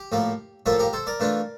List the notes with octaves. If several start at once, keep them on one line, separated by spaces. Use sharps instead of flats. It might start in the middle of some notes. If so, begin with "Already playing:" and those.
Already playing: G4
A2 F3 A#3 E4
A2 F3 A#3 E4 F4 A4
G4 A#4
A4 C5
A#4 D5
E3 A3 D4 F4